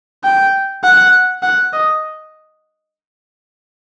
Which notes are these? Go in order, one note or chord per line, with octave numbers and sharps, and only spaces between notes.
G5
F#5
F#5
D#5